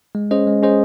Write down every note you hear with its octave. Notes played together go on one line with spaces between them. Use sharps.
G#3
C#4 G#4 C5 D#5
G#3
C#4 G#4 C5 D#5